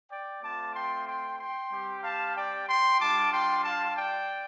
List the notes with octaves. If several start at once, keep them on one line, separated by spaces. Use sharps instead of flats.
D5 G5
A3 C4 F4 A5 D6
G5 C6
G5 C6
G5 C6
G3 C4 G4
F5 A5
D5 G5
G5 C6
G3 D4 F4 A5 D6
G5 C6
F5 A5
D5 G5